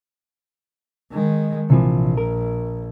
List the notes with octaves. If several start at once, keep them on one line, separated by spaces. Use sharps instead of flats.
D#3 G#3
A#1 C3 E3 F3
A#4